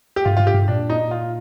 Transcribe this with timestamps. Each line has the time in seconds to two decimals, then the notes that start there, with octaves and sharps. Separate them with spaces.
0.16 G4
0.25 G2 F4
0.37 G2 F4
0.47 G4
0.54 G2
0.68 A#2 D4
0.90 D#4
1.11 F4